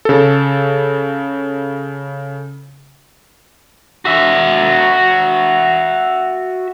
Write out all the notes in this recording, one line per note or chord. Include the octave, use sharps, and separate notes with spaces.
C#3 A4
F#4 E5